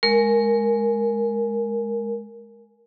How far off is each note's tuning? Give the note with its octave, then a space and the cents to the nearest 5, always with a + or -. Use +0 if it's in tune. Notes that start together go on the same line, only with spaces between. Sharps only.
G#3 +10 A#4 +0